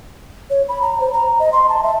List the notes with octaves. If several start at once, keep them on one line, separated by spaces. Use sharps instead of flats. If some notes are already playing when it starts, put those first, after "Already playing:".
C#5
B5
A#5
C5
A#5
D#5
C6
A5
E5